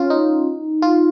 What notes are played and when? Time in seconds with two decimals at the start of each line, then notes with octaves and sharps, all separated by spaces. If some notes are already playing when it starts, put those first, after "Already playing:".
Already playing: C#4 F4
0.10 D#4
0.82 F4